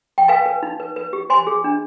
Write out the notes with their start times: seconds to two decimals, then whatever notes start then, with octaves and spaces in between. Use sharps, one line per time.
0.18 G5
0.28 B4 F5 G#5
0.46 B4
0.63 D#4
0.80 B4
0.96 B4
1.13 G4
1.30 C5 G#5 C6
1.47 G#4
1.64 D4